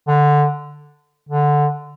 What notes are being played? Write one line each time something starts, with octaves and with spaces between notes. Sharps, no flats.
D3
D3